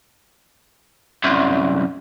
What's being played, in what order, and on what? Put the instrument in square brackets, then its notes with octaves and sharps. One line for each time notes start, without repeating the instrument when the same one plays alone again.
[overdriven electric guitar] C2 F#2